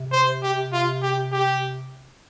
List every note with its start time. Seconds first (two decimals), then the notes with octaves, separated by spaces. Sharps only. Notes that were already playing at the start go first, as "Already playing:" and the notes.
Already playing: C3
0.12 C5
0.43 G4
0.73 F4
1.02 G4
1.32 G4